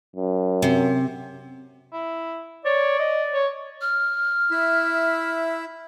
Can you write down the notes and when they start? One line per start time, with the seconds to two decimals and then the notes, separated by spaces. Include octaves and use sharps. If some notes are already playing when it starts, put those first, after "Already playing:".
0.16 F#2
0.62 C3
1.92 E4
2.65 C#5 D5
2.99 D#5
3.34 C#5
3.82 F6
4.51 E4 E5